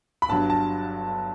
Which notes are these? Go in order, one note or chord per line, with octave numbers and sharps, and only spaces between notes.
B5
G1 G2 F#3 A5
A5